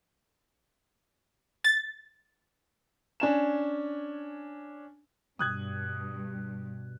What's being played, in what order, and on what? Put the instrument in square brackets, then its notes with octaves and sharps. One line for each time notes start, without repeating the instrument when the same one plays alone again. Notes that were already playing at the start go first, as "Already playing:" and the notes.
[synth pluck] A6
[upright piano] C#4 D4 G#5 E7
[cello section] G2 [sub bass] B2 [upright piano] D#6 F#6 G#6